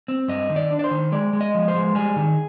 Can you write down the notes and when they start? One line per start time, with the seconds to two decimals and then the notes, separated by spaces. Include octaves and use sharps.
0.08 C4
0.28 G2 D#5
0.50 D#3
0.56 D5
0.70 D4
0.79 D5
0.84 C5
0.91 D#3
1.12 G#3 D5
1.33 G#3
1.41 D#5
1.55 F3
1.68 C5
1.75 G#3
1.95 G3 G#4
2.16 D#3